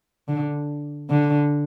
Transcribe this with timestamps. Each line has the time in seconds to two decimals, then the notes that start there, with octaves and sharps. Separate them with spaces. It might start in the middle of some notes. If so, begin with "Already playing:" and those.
0.28 D3
1.10 D3